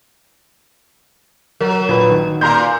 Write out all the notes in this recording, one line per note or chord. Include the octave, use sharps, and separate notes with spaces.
F#3 A#4
A#1 B4
D#3
A#2 A#4 A#5 C6 G6